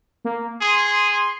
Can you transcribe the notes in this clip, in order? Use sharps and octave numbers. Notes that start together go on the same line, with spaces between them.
A#3
G#4 C6